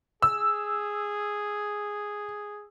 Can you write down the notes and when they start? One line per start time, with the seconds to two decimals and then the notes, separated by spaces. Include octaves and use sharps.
0.22 G#4 E6